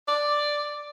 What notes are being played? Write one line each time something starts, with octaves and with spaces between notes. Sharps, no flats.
D5